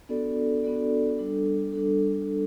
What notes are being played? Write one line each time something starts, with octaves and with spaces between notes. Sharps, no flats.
B3 D4 F#4 A4 D5
B3 D4 F#4 A4 D5
G3 D4 A4
G3 D4 A4